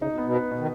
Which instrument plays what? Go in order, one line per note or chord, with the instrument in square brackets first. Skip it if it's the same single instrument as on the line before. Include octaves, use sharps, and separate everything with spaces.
[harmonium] C#3 [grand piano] D#4
[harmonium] B2
[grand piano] B3
[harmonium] B2
[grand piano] B4
B2
[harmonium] D#3